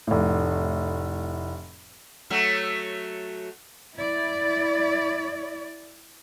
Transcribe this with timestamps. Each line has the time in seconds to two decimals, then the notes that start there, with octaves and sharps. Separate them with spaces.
0.07 F1 A2
2.30 F#3 A3
3.95 E4 D5